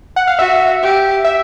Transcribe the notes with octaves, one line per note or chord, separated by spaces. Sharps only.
F#5
F5
F#4 E5
G4
E5